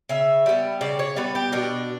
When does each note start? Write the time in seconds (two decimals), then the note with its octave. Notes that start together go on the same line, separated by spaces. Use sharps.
0.09 C#3 E5
0.46 G3 B3
0.81 C#3 D5
0.99 C#5
1.16 G3 B3 B4
1.35 G4
1.52 B2 D4